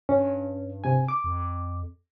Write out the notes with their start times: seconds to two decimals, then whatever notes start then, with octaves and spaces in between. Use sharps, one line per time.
0.09 G2 C#4
0.84 C3 G#5
1.08 D6
1.24 F2